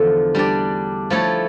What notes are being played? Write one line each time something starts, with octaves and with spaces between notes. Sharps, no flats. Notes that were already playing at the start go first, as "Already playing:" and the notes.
Already playing: E2 D3 F3 A3
G3 D4 G4 D5
F3 A3 E4 A4 C#5